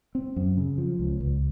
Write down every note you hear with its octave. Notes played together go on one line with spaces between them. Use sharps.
C4
F#2
C#3
F3
C#2
C#2